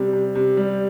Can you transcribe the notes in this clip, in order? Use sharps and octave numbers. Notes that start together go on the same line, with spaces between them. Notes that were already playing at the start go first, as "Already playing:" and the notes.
Already playing: C3 G3
C3
C3
G3